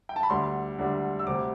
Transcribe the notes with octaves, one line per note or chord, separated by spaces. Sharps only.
G5
A5
B5
D2 D3 G3 D4 C6
D2 D3 G3 D4
E6
D2 C3 G3 C4 D6